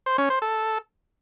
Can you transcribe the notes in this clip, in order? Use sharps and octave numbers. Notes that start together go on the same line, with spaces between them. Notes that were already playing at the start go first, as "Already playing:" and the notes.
C5
C#4
C5
A4